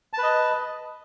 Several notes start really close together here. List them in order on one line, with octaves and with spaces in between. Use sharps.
A5 B4 D#5